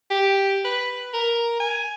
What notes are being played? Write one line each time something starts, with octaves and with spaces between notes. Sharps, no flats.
G4
B4
A#4
G#5